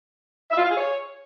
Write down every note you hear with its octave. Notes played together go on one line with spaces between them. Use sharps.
E5
F4
F5
G#4
C#5